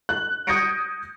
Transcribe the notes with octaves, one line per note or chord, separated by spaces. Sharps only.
F#6
D#6 G6 G#6 A#6 C#7 D7